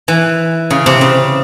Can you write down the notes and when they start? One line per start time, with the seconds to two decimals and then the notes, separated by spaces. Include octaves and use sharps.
0.08 E3
0.70 C#3
0.86 C3
1.01 C#3